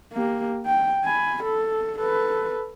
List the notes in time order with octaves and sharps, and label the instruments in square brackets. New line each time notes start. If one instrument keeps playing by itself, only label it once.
[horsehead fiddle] A#3 G4
G5
G#5 B5
A4
A4 B4